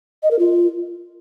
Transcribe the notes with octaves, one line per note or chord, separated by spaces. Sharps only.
D#5
A#4
F4